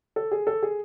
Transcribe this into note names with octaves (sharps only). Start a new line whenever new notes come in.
A4
G#4
A4
G#4